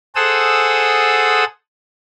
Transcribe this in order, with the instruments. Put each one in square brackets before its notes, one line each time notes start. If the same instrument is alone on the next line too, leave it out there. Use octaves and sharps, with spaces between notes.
[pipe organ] G#4 A4 C5 F#5 D#6 E6